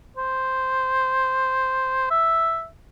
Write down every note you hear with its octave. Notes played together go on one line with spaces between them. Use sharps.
C5
E5